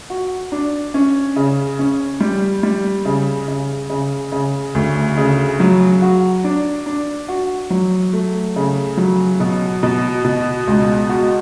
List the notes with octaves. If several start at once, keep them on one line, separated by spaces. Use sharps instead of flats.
F#4
D4
C#4
C#3
C#4
G3
G3
C#3
C#3
C#3
C#3
D2
C#3
F#3
F#4
D4
D4
F#4
F#3
A3
C#3
F#3
B2
B2
B2
C#2
F#4